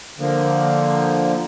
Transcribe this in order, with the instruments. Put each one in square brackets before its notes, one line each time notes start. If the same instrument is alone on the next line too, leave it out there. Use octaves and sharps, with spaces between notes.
[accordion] D3 F3 A#3